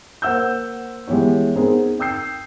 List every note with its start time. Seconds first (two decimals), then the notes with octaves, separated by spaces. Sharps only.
0.22 A#3 C5 F#5 E6 G6
1.08 E3 G#3 B3 G4 C#5
1.56 B3 C4 D#4 G#4 A#4 C5
1.99 G5 D#6 E6 G6 C7